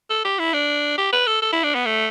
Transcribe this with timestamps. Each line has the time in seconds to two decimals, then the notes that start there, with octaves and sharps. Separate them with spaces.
0.10 A4
0.24 G4
0.39 E4
0.53 D4
0.98 G4
1.13 B4
1.27 A4
1.42 A4
1.53 E4
1.63 D4
1.75 B3
1.85 A3